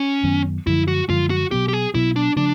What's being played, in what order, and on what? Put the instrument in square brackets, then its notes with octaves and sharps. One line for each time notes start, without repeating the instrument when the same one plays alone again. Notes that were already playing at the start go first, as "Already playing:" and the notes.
Already playing: [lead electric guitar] C#4
[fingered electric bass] F#2 D#3 F#3 B3
[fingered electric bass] F#2 D3 F3 G#3 [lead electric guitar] E4
[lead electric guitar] F#4
[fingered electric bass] F#2 D3 F3 G#3 [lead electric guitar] F4
[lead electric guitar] F#4
[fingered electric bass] B2 F#3 B3 [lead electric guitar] G4
[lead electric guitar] G4
G#4
[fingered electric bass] B2 F#3 B3 [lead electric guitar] E4
[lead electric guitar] D4
[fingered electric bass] C#3 F3 A3 [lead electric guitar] D4